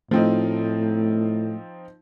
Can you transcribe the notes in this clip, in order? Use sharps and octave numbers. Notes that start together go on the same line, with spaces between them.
A2 F3 A3 C4 D#4